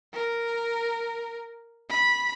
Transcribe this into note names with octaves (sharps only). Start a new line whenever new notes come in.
A#4
B5